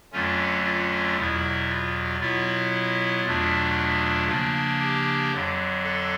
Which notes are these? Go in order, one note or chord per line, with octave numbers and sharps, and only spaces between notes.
F2 D3 F#3 A3 C#4 F4
F4
E2 B2 F#3 E4
F4
B2 F#3 B3 E4 F4
E2 B2 F#3 A3 D4 F4
C#3 F3 A#3 D4
G4
F2 D3 F#3
A4